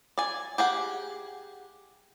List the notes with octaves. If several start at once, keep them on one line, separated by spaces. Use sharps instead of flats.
D5 G#5
G4 G#4 F#5